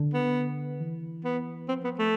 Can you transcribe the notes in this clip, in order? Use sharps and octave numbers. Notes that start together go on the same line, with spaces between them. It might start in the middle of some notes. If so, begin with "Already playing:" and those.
Already playing: D3
B3
E3
B3
F3 C4
B3
A3